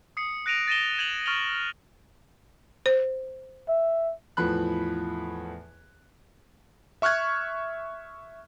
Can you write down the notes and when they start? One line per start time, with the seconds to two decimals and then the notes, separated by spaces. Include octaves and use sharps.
0.17 D#6 C7 C#7
0.46 F#6 A#6 D7 D#7 F7
0.68 A6 A#6 D#7 E7 G7
0.99 G#6 D#7 F7 F#7
1.26 C#6 F6 A6 D7 F7 G7
2.86 C5
3.68 E5
4.37 E2 A2 F3 B4 B5 F#6
7.02 E5 C#6 F6 F#6 G#6